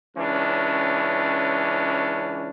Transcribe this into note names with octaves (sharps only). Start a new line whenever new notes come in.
C#2 E3 C#4 D4